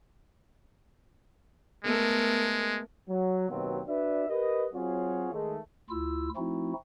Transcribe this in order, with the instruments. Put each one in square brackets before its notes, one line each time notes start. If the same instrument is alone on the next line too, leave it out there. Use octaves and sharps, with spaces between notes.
[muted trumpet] G#3 [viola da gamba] A3 B3 A#4
[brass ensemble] F#3
D#2 B2 F#3 B3 C4
D4 F#4 B4 D5 E5
G4 A#4 B4 D#5
F#3 C4 F4 F#4 G#4 C#5
D#3 G#3 A3
[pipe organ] D2 E4 F4 E6
F3 A3 C4 D#4 E4 F#4